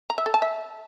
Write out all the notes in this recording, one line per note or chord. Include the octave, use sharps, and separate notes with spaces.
A#5
E5
A4
A5
E5